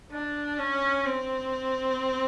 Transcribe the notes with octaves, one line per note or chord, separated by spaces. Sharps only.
D4
C#4
C4